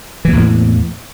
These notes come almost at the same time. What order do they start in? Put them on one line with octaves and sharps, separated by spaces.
E3 A#3 E2 A2